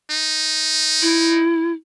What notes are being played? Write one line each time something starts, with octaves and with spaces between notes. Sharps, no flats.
D#4
E4